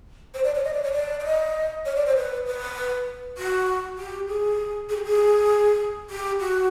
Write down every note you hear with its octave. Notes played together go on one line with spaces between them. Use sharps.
C5
D5
C#5
D#5
D5
C#5
D5
D5
D#5
C#5
D5
C5
B4
B4
F#4
G4
G#4
G#4
G4
G#4
G4
F#4